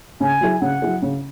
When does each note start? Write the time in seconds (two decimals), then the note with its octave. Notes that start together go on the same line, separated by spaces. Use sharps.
0.20 C#3 G#5
0.41 F#3 E4 G#4
0.61 C#3 F#5
0.82 F#3 E4 G#4
1.02 C#3